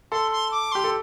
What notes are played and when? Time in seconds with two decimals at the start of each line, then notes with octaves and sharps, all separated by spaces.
0.12 A4 C6
0.32 C6
0.52 D6
0.72 G4 C6
0.84 A4